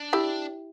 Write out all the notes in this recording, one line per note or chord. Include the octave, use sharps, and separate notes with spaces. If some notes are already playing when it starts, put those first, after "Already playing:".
Already playing: D4
E4 G4